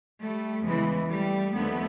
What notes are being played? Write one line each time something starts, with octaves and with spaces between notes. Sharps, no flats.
G3 A3
E2 C#3 E3 G#3
G3 A3
D#2 D3 F3 A3 B3